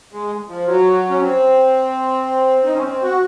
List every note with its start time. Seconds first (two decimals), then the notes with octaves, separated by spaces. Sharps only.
0.13 G#3
0.48 F3
0.67 F#3
1.10 C#4
1.21 C4
2.64 D#4
2.74 C#4
2.84 C4
3.02 F#4